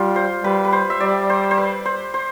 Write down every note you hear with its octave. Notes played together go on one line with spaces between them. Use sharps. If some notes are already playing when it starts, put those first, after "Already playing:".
Already playing: G3 F4
C5
G3 B4
B4
C5
E5
G3 D5
C5
C5
B4
C5
C5